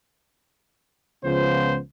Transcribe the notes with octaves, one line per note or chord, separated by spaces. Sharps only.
C#2 C#3 F3 B3 C5